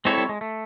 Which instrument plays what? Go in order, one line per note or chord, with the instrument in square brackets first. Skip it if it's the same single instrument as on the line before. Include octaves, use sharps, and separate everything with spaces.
[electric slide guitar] G#3 [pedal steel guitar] C4 E4 A4 C#5
[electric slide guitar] G3
G#3
A3